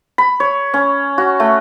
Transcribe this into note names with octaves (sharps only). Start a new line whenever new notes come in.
B5
C#5
C#4
F#4
A3